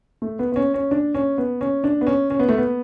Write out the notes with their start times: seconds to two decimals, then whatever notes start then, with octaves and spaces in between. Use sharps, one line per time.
0.22 A3
0.39 B3
0.52 B3
0.56 C#4
0.74 C#4
0.91 D4
1.15 C#4
1.38 B3
1.61 C#4
1.84 D4
2.01 B3
2.07 C#4
2.30 C#4
2.39 B3
2.49 A3
2.58 B3